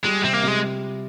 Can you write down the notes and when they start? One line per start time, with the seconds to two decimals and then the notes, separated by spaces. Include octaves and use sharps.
0.05 G3 G#3
0.24 C3 C4
0.33 A#3
0.43 C3 G#3